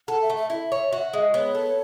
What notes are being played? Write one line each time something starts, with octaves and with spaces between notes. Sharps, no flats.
A4 F#5
E5
A3
E5
E4 E5
C#5
F#4
G#3
B3 C#5
A4